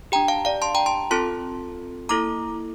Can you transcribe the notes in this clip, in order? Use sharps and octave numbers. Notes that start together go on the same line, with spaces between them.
D4 G4 G5 A#5
F5 A5
D5 F5
A5 C6
G5 A#5
A5 C6
C4 F4 A4 A5 C6
A#3 E4 A4 A#5 D6